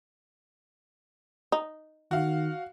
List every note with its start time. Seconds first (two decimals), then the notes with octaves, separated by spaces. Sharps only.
1.52 D#4
2.11 D#3 F#4 F5